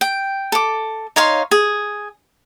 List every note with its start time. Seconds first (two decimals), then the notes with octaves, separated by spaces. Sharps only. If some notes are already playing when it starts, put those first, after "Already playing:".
0.01 G5
0.52 A4 D6
1.16 D#4 C#5 F5 C6
1.51 G#4